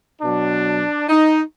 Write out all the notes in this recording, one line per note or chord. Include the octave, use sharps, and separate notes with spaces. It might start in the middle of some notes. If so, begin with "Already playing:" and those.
B2 F#3 D4
D#4